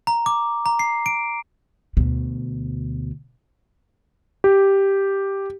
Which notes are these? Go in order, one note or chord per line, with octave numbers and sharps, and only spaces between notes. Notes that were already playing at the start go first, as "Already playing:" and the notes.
A#5
D6
A#5
C7
D7
D2 B2
G4